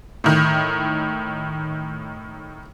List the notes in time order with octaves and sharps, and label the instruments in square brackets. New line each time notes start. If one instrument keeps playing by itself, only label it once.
[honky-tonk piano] A2 D#3